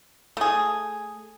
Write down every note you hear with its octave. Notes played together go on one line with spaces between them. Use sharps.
A3 G#4